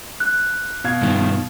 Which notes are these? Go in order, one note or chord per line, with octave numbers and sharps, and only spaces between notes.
F#6
B2 F5 G#6
G2 D#3